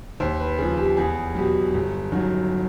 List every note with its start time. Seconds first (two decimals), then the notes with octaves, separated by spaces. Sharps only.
0.20 D#2 C5
0.40 B4
0.58 C#3 F3 G#4
0.78 G4
0.97 E2 G#4
1.35 B2 F#3 G4
1.74 G1
2.12 F#2 D#3 F#3